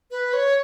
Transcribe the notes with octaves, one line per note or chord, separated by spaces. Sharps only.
B4
C#5